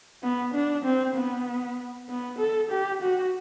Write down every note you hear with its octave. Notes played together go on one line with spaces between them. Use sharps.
B3
D4
C4
B3
B3
A4
G4
F#4